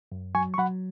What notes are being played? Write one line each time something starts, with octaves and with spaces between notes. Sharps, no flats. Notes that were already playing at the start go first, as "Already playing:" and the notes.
F#2
F#3 G#5 C#6
C#6
F#3 F#5 B5